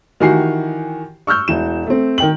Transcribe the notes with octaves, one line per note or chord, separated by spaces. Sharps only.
D#3 E3 F#4 G4 G#5 C7
C#6 E6 F6 G6
E1 E3 E7
A3 C4
D#3 G5 F#7